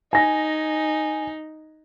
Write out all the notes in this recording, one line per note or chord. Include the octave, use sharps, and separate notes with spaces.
D#4 G#5 A#6